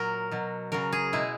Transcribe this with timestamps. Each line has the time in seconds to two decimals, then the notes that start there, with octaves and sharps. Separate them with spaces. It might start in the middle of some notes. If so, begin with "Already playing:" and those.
Already playing: A#2 F#3 A#4
0.31 B2 F#3
0.72 C#3 F#3 A#4
0.92 G#4
1.13 B2 G#3 E4